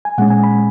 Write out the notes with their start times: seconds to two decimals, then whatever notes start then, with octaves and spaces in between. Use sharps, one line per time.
0.05 G#5
0.18 A#2 G#3 C#4 F#5
0.30 G#5
0.43 B5